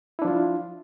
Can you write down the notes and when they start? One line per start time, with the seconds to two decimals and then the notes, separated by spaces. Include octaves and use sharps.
0.19 E4
0.22 D4
0.25 F3
0.28 F4